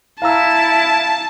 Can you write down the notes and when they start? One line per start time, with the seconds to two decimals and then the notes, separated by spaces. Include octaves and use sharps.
0.22 E4 F5 A5 A#5 E6